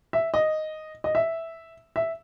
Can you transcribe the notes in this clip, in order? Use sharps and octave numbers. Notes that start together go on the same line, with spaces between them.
E5
D#5
D#5
E5
E5